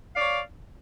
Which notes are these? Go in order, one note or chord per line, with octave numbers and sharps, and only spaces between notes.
C#5 D5 F5